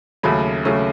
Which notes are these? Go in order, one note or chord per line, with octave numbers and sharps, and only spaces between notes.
D#2 C#3 F#3 A3 C#4 B5
C#3 F#3 A3 C#4